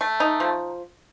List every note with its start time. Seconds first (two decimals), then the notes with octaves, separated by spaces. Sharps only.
0.01 A3
0.20 D#4
0.40 F3